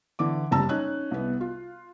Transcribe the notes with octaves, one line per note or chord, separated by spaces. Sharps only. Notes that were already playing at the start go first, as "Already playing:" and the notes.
D3 E3 D6
F#1 G3 A5 A#5 E6
C#4 D#4 F#6
C2 B3
F4